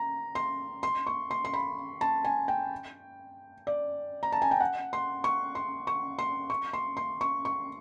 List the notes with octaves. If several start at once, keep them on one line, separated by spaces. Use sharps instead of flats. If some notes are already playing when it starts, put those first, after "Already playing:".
Already playing: A#5
C6
C6
C#6
C6
C6
B5
A5
G#5
G5
D5
A#5
A5
G#5
G5
F#5
C6
C#6
C6
C#6
C6
C#6
C6
C6
C#6
C#6